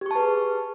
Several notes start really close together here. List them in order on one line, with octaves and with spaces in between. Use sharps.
G4 C#6 A5 B4 G#4